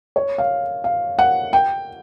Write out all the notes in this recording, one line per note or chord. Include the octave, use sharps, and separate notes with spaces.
C#5
F5
F5
F#5
G5